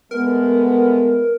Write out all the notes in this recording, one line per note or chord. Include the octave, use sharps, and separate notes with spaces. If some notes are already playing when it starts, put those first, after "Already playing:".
G#3 A3 B3 A#4